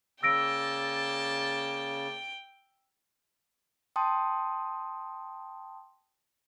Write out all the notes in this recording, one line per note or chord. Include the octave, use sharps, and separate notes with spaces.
C#3 A#3 D5 G5 A5 E6 A#6 D7
G5 A5 C6 D#6